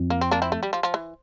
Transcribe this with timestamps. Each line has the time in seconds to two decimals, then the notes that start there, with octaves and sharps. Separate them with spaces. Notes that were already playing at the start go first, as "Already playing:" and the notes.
Already playing: F2
0.10 A#3
0.21 C4
0.31 A#3 D4
0.42 C4 E4
0.52 A3
0.63 G3
0.73 F3
0.83 F3
0.94 E3